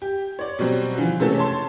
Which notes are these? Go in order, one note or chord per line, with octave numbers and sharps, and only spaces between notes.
G4
C#5 D5
B2 F#3 G3 C4
D3 E3 F3
C3 G#3 A3 C#4 A4
C#5 A5 C6